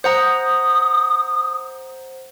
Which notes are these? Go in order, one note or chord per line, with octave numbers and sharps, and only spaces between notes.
C5 F#5 A#5 D#6